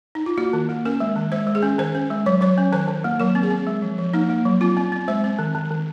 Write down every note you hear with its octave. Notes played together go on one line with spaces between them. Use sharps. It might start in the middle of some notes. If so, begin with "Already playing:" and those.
D#4
F4
A#3 F#4
D#3
A#3
C#4 A#4
G#3
D#3
G#3 C5
G#3
G#4
C#4
D#3 C5
C#4
G#3
F#3 C#5
F#3 C#5
C#4
D#3 C5
D#3
A#3
F#3 A#4
C4
G#4
C4
G#3
F3
F3
A#3 D#4
A#3
F#3
C4 F4
C4
C4
G#3 C5
C4
D#3
D#3
D#3